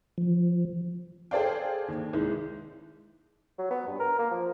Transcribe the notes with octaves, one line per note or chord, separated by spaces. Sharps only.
F3
G#4 A4 C5 D5 F5 G5
D#2
C2 D#3 G#3
F#3
B3
G2
A#4
A#3
F3